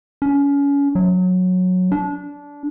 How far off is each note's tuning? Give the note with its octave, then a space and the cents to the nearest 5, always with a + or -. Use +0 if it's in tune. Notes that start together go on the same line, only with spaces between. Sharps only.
C#4 +30
F#3 -15
D4 -20